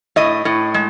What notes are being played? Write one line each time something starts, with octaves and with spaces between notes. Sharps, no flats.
A2 D#5
A2
G#3